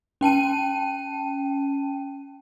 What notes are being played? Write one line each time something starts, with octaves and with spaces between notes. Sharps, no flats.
C#4 G5 A5 D#7